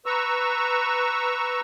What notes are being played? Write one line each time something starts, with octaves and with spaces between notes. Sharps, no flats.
B4 A#5 C#6 E6